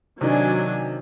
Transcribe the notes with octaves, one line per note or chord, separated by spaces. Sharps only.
C3 D#3 F#3 D4 D#4 G#5